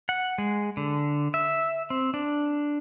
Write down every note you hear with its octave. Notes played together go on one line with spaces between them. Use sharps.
F#5
G#3
D3
E5
C4
D4